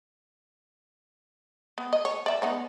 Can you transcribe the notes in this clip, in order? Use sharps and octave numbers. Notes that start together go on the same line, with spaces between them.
B3
D#5
C#5
D5 E5
B3 D#4 C#5